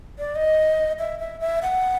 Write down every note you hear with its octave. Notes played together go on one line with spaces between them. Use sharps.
D5
D#5
E5
E5
E5
F#5